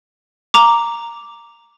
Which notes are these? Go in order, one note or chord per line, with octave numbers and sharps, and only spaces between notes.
A#5 D6